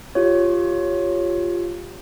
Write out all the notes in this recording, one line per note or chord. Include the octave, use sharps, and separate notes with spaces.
F4 G4 C#5